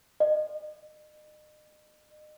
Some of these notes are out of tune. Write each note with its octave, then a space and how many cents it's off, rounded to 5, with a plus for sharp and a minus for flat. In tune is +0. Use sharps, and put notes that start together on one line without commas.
D#5 -40